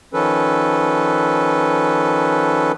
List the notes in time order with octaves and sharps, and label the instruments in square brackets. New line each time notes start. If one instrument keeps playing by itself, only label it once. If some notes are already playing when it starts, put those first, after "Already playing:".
[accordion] D#3 F3 C#4 A4 B4